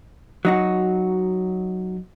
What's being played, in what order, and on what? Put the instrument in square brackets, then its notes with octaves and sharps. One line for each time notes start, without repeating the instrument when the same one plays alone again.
[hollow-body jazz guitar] F#3 D#4 F#4